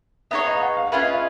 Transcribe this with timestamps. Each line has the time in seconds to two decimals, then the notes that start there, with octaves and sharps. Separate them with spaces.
0.31 B3 D#4 G#4 C#5 E5
0.47 D#5
0.55 F5
0.62 F#5
0.77 F5
0.87 F5
0.92 C#4 F4 G#4 B4 E5
1.03 D#5
1.13 E5